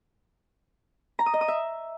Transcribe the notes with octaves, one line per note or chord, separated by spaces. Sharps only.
A#5
D#6
D#5
D#6
E5